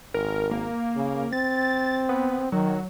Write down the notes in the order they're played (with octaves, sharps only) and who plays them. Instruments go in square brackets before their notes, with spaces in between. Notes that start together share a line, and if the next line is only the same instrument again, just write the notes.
[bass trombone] G#1 [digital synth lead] A#4
[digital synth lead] A#3
[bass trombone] C#3
[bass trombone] C4 [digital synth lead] A6
[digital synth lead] B3
[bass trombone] D#3 [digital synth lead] F#3